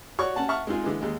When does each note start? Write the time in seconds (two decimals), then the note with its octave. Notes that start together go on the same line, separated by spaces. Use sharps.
0.19 F#4 C#5 D5 C#6
0.36 C#4 F#5 A5
0.49 E5 F#5 A5 C#6 F6
0.67 G#3 C4 D#4 F4 G#4
0.84 D3 E3 G#3
1.01 D#2 G#3